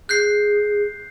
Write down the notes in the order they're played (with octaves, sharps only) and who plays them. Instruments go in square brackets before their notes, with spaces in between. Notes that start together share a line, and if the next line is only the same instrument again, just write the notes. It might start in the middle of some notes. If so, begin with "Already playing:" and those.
[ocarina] G#4 [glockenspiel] F#6 G6 C7